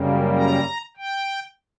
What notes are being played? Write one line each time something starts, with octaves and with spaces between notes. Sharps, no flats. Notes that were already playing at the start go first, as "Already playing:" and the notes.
Already playing: F#2 C#3 G3 A#3
A#5
G5